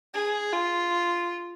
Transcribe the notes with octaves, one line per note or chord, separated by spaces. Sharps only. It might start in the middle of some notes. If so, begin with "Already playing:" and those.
G#4
F4